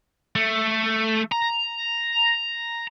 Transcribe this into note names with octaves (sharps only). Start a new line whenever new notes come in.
A3
A#5